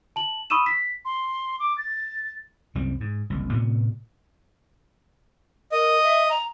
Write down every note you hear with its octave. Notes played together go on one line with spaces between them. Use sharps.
A5 F#7
B5 C#6 D#6 E6 D#7 E7
B6
C6
D6
A6
C2 F#2 G3 C4
G#2
F#1 C2
A2 C3 B3
A#4 D#5
E5
A#5